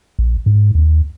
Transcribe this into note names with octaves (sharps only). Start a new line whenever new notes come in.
A#1
G#2
D#2